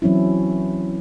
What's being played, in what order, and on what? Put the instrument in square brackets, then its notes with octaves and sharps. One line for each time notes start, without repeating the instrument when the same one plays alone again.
[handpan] E3 F#3 C4 C#4 E4